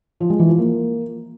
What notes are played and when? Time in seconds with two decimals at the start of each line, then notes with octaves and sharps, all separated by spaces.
0.20 F3
0.30 G#3
0.39 E3
0.49 F3
0.58 A#3